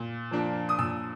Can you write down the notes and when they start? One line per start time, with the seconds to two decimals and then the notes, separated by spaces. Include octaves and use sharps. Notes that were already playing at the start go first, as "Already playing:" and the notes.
Already playing: A#2
0.31 F3 A#3 D4
0.69 D#6
0.78 A#2 E6